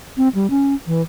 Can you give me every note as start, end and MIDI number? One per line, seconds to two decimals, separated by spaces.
0.17 0.28 60
0.35 0.50 55
0.50 0.74 61
0.87 1.02 52